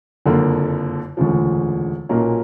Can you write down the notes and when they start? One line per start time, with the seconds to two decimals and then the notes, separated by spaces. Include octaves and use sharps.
0.26 F#1 F2 D3 F3 A#3
1.17 E1 D2 C#3 F3
2.09 B1 A#2 F#3 A#3 C#4